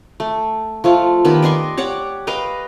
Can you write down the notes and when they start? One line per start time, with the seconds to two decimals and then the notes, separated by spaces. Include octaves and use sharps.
0.20 A3
0.84 F3 A3 F4
1.25 D#3 B3 G4 B5
1.42 D5 D#5 C6 C#6
1.77 G4 C#5 D5 F#5
2.27 B4 D#5 F5 G5